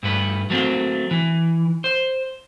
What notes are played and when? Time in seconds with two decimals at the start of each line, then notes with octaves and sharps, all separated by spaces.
0.03 G2 A3 B4
0.50 F#3 A3 A#3 C4
1.11 E3
1.84 C5